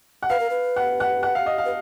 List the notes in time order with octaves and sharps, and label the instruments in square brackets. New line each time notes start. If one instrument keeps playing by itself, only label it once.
[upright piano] F#5
[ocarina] B4 [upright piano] F5
[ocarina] A#4
B4
[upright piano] F#5
F#5
F#5
F5
D#5
F5
[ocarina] B4